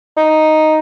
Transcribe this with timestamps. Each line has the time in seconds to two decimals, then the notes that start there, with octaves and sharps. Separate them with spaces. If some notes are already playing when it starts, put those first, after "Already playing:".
0.17 D#4